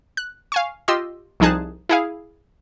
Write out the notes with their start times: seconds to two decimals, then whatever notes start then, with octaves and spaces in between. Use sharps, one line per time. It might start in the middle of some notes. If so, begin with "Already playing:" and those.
0.17 F#6
0.52 F5 G#5 C#6
0.88 F4 G4 D#5 C6 E6
1.40 C2 F3 D#4 G#4 A5 F#6
1.89 E4 G#4 F5